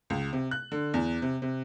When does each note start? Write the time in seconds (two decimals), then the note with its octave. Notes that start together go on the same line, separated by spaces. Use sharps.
0.10 C#2
0.33 C3
0.51 F#6
0.72 D3
0.94 E2
1.22 C3
1.42 C3